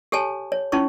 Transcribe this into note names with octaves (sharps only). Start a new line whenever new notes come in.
G4 A4 C#5 G#5 A5
C#5
C#4 D#4 E4 C#5 C#6